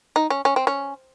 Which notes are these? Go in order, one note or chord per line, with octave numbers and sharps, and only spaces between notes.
D#4
C#4
C#4
C4
C#4